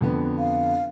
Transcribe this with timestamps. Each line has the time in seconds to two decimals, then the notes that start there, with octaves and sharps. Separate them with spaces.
0.01 F2 D3 B3
0.39 F5